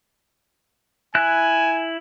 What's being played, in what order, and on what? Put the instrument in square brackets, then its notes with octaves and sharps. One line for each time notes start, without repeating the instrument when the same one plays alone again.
[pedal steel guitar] E4 F#6 [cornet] G#5